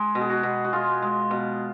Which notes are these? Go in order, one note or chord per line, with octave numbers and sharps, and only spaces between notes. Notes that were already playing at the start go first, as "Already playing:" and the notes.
Already playing: G#3
B2
G#4
F#4
B2
F#4
G#3 F4
G#3
B2